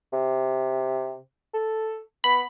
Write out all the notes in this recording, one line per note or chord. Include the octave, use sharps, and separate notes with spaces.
C3
A4
B3 B5